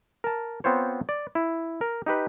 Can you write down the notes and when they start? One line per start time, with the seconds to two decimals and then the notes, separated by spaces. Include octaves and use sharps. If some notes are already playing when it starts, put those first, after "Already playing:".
0.24 A#4 A5
0.64 B3 C4 F4 C5 C#5
1.09 D5
1.35 E4
1.81 A#4
2.06 D#4 G4 B4